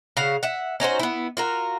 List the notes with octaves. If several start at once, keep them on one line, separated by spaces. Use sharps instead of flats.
C#3 F#4 F5 F#5
E5 F#5
C#4 D#4 F#4 C5
B3 E4
F4 F#4 A#4